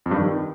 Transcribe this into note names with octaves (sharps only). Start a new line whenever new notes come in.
F2
G2
D#3